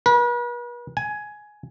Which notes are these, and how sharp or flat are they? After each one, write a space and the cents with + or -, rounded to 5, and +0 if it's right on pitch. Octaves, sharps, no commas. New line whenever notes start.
B4 -40
G#5 +10